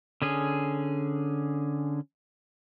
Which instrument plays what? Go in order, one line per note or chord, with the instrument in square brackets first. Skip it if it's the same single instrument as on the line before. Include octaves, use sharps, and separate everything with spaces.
[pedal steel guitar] D3 C#4 G#4